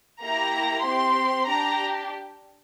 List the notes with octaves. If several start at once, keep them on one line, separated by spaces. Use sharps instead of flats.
A#3 E4 G4 A#5
C4 G4 C6
D4 G4 A#5